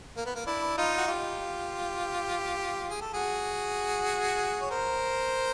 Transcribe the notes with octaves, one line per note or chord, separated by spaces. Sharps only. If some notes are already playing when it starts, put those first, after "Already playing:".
A#3
B3
A#3
D4 E4
D#4 F4
F#4
F4 G4
G#4
A4
F#4 G#4
C#5
A#4 C5